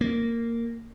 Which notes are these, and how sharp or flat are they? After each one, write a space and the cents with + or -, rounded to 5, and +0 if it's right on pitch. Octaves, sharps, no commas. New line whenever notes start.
A#3 -10